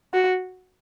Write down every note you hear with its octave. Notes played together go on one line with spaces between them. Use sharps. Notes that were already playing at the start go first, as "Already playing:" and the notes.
F#4